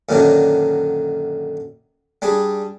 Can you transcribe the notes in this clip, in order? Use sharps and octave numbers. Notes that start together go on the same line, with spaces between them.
F#2 A#2 D3 D#3 F#3 D4
G3 D4 G#4